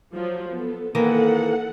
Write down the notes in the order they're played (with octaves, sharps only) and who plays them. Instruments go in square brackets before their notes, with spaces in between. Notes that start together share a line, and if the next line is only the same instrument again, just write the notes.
[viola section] F3 F#3
B3 A4
[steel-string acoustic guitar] D#3 E3 A#3 [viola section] A4 F#5